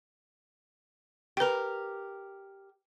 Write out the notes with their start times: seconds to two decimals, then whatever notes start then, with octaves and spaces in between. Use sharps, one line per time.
1.37 G4 A#4 B4 G5